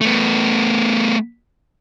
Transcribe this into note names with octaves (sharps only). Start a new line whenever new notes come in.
A3 B3